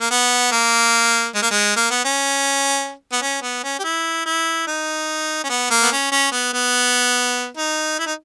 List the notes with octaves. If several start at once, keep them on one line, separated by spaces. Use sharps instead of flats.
A#3
B3
A#3
G#3
A#3
G#3
A#3
B3
C#4
B3
C#4
B3
C#4
G4
E4
E4
D#4
C#4
B3
A#3
B3
C#4
C#4
B3
B3
D#4
E4
D#4